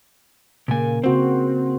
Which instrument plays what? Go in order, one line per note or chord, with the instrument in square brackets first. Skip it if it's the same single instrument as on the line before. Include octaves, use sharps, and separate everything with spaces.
[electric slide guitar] A#2 G#5 [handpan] C#3 A#3
[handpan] C#3 F#4 C5 [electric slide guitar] C4